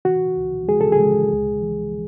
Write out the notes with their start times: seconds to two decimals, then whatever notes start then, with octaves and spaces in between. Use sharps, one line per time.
0.05 E3 F#4
0.37 C#2
0.68 G#3 G#4
0.81 A4
0.92 G#4
1.00 G#3
1.32 C#2
1.62 E3